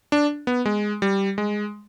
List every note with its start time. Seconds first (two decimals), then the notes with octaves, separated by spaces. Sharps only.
0.12 D4
0.47 B3
0.66 G#3
1.02 G3
1.38 G#3